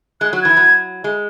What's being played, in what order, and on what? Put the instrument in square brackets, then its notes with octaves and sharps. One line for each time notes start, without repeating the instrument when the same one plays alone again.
[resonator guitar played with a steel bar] G#3 [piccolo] F#6
[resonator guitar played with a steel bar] F#3 [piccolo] F#6
[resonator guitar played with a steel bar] E3 [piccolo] G#6
[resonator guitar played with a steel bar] F#3
G#3